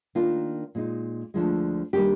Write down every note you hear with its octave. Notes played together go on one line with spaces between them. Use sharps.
D#3 A#3 D4 F4
A#2 G#3 D#4
D2 D3 F3 G#3
D#3 G3 A#3 D4 G4